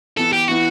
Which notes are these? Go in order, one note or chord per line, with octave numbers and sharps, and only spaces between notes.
E3 B3 E4 A4
G4
E3 B3 E4 F#4